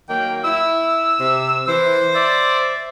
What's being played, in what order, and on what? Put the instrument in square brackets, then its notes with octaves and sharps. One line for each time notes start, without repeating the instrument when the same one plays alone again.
[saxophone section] D#3 F#3 A#3 [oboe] G5
[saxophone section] E4 [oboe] E6
[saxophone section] C3
[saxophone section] E3 [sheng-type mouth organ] C5
[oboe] D5 [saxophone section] E5